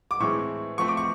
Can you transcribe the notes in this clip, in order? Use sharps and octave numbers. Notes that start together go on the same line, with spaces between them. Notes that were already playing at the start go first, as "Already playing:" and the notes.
D6
A2 E3 G#3 C4 C#6
F3 A3 C4 C#6
D6
C#6